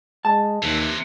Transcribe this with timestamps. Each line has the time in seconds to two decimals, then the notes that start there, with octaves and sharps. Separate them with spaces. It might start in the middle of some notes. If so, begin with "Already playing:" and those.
0.25 G#3 A5
0.63 D#2 C3 E3